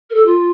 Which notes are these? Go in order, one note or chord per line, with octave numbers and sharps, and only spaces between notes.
A#4
A4
F4